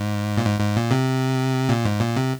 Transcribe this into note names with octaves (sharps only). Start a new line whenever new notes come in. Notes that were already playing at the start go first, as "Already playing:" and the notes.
Already playing: G#2
A#2
G#2
G#2
A#2
C3
A#2
G#2
A#2
C3